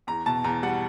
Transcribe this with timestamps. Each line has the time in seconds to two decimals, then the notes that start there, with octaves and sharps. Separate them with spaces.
0.07 E2 A#5
0.26 B2 A5
0.44 E2 A#5
0.63 G3 F#5